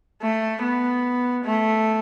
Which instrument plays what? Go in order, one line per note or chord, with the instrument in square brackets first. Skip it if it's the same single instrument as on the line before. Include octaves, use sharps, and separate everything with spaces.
[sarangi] A3
B3
A3